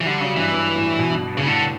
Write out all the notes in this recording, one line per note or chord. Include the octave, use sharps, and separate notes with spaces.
E3
D3 G3
C#3 F#3
G2 E3
G2
A2
B2
G2
G2
G2 C#3
A2 D3